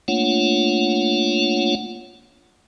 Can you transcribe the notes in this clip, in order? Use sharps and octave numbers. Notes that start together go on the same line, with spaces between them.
A3 A#3 D4 F4 C#5 F#5